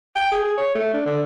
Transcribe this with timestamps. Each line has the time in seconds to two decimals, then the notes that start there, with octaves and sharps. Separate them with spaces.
0.16 G5
0.32 G#4
0.44 G#4
0.58 C#5
0.75 A3
0.94 D4
1.06 D3